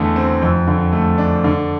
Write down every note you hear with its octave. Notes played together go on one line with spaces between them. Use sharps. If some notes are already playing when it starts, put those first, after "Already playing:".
Already playing: E2 D3 A3
C4
F2
D3
A3
D4
D3